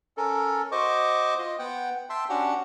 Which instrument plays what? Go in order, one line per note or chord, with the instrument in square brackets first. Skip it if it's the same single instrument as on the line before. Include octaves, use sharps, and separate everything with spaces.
[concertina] C#4 A4 A#4
F#4 C5 D#5 C#6 D6
F4 D#5
B3 F#5 G5
E5 G5 A5 C6
C#4 D4 F#4 G4 F#5